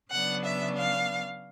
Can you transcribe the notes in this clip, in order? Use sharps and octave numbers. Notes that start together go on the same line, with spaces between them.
C#3 F#3 B3 D4 F#5
E5
F5